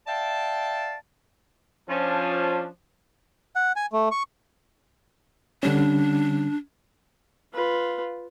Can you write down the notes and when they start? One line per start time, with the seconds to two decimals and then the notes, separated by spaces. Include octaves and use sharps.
0.07 D5 E5 F5 G5 A5
1.89 F3 C#4 D4
3.56 F#5
3.76 G#5
3.93 A3
4.11 C#6
5.63 D3 G3 C#4 D4
7.53 F4 B4